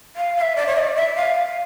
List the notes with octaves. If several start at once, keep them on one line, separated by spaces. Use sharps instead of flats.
F5
F5
E5
D5
C#5
E5
D5
E5
F5
F5